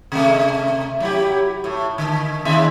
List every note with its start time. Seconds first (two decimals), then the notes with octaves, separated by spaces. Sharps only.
0.12 C3 A3
1.00 F#3 E4 G4
1.64 A2
1.98 D3
2.45 D#2 C#3 E5